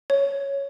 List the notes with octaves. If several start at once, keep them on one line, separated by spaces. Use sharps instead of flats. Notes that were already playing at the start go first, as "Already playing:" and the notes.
C#5